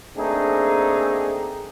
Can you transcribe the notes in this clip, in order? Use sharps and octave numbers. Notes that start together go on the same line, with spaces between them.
A3 A#3 C4 D4 D#4 G#4